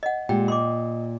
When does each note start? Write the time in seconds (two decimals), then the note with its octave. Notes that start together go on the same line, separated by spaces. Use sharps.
0.03 D#5 F#5
0.29 A#2 G#3 G4 G5
0.48 D#5 C6 D6